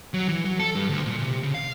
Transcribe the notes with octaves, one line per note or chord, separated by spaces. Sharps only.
F#3
E3
F#3
A4
G2
D2
A#2
C3
C#3
F5